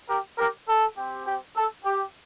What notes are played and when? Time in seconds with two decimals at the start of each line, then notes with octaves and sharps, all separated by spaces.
0.08 G4 A#4
0.37 G4 A#4
0.68 A4
0.96 C4 G4
1.25 G4
1.56 A4
1.84 G4